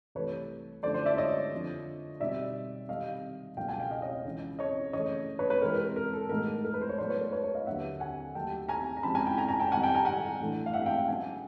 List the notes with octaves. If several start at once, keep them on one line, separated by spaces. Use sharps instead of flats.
C2 C3 E3 A3 B4 C#5
F#2 D3 F3 A3 C5 D5
C5 D5
D5 E5
C#5 D#5
F2 D3 F3
B2 G3 C4 D#4 D5 E5
C3 D#3 G3 C4 D#5 F5
C#2 B2 F#3 A#3 F5 G5
F#5 G#5
F5 G5
D#5 F5
C#5 D#5
C#2 C#3 E3
C#5 D#5
C#3 E3 A3 C#5 D#5
B4 C#5
B4 C#5
C3 E3 G#3 C4 A#4
A#4
A#4
A4
A2 E3 G#3 B3 D#4 A#4
A#4
B4
C5
C#5
A2 F#3 B3 C5 D5
B4 C#5
A#4 C5
B4 C#5
B4 C#5
D#5 F5
D#2 D3 F#3 A#3 E5 F#5
F#5 G#5
D#2 D#3 F#3 A3 G5 A5
G#5 A#5
A#5
F2 C#3 F3 G#3 C4 A5 B5
G#5 A#5
G5 A5
G#5 A#5
G#5 A#5
G5 A5
F2 C3 D#3 G3 F#5 G#5
G5 A5
G#5 A#5
F#5 G#5
A2 E3 A3 D4
F5
E5 F#5
F5 G5
F5 G5
C#3 F#3 B3 D#4 F#5 G#5